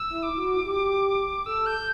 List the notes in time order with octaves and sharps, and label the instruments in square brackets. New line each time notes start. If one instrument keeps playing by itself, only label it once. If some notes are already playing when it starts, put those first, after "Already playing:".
Already playing: [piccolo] E6
[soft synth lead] E4
[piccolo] D6
[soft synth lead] F#4
G4
[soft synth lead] A4 [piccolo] E6
[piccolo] G6